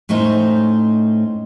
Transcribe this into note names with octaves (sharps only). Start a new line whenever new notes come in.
A2 A3 C#4 D#4 C5